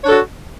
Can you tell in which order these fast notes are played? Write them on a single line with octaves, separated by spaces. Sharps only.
C#5 D4 A4 F#4